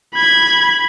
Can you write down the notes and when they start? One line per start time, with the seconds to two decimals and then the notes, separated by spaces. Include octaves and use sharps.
0.15 B5 G#6